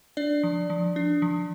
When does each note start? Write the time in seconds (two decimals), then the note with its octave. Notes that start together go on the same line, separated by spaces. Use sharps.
0.17 D4 D5
0.43 F3
0.70 F3
0.96 D4
1.22 F3